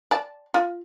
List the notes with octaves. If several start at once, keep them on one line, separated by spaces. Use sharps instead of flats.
D5 A5
F4